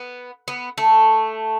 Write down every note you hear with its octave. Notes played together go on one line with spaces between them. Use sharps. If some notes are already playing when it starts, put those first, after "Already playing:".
Already playing: B3
B3
A3